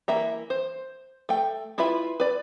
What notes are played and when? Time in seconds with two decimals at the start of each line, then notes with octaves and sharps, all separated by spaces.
0.08 E3 A#3 E5 A#5
0.50 C5
1.29 A3 G5
1.78 E4 F4 B4 E5 B5
2.20 B4 D5